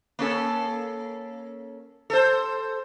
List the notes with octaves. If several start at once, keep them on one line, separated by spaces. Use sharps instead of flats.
A#3 C#4 A4
A4 C5